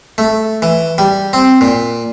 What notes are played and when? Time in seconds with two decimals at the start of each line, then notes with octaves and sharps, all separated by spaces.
0.18 A3
0.62 E3
0.98 G3
1.33 C4
1.61 A#2